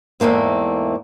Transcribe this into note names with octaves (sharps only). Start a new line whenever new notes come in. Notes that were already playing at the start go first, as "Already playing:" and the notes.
E2 G#2 A3 A#3 C4